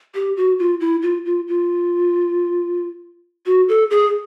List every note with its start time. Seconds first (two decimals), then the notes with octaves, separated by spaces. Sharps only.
0.15 G4
0.37 F#4
0.59 F4
0.80 E4
1.02 F4
1.25 F4
1.48 F4
3.46 F#4
3.69 A4
3.91 G#4